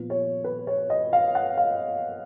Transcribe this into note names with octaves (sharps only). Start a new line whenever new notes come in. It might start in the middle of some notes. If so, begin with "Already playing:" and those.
Already playing: A#2 F3 B3
C#5
B4
C#5
D#5
F5
F#5
F5